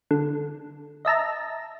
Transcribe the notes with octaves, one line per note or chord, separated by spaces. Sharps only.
D3
D#5 E5 A5 A#5